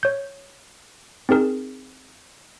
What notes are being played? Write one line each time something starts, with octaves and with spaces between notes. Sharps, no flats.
C#5 G6
C4 D#4 G#4 A#4